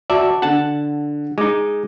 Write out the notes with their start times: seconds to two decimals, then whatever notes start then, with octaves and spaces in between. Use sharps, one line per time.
0.10 F#4 D5 E5 A5
0.42 D3 F#5 A5
1.38 G#3 D#4 D6